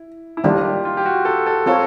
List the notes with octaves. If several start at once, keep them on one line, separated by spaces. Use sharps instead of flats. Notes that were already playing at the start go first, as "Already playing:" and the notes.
Already playing: E4
E4
D#3 G3 A#3 D4 F4
G4
F4
G4
F#4
A4
A4
C4 F4 A4 A#4 C#5